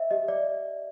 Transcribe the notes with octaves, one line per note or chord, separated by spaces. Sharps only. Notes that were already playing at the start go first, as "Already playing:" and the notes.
Already playing: C5 D#5 E5
G4 D#5
D5